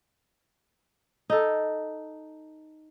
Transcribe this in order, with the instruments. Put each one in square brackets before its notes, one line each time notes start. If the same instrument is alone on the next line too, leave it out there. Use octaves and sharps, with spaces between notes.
[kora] D#4 A4